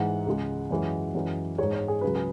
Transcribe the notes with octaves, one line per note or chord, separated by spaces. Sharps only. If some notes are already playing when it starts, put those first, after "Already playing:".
Already playing: G#2 E3 G#3 F#5
C#2 C#3 G#3
F#2 E3 G#3
F#2 E3 G#3
G#2 G#3 C#5
C#5
G#4
C#2 C#3 F#3 B4
G#4